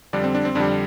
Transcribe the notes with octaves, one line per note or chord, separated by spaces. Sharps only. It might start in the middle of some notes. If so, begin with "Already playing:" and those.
F2 D3 G3 D4
C4
D4
C4
F2 D3 G3 D4